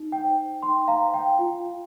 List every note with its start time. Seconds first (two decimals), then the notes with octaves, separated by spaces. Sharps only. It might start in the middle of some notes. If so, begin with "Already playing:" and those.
Already playing: D#4
0.12 G5
0.24 C5
0.63 D#4 G5 C6
0.88 F5 A#5
1.01 C5
1.14 G5
1.39 F4